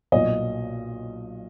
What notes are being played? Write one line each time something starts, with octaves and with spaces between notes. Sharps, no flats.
B1 A#2 F#3 D#5